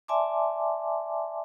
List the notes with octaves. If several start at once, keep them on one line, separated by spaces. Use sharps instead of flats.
D5 E5 G#5 A5 C6 D6